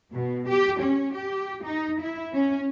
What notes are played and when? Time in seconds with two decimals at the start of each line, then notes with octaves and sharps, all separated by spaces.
0.13 B2
0.49 G4
0.81 C#4
1.16 G4
1.64 D#4
2.01 E4
2.33 C#4